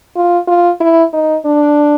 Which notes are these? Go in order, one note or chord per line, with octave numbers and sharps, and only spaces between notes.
F4
F4
E4
D#4
D4